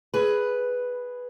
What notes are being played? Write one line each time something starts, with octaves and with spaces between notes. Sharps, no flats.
G#4 B4